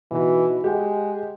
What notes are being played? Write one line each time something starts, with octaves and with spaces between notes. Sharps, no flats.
B2 E3 D#4 F#4
G#3 G4 F#5 G5